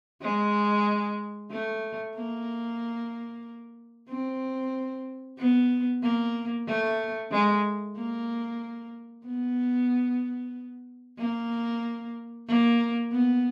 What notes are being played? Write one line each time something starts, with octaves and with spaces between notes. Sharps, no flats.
G#3
A3
A#3
C4
B3
A#3
A3
G#3
A#3
B3
A#3
A#3
B3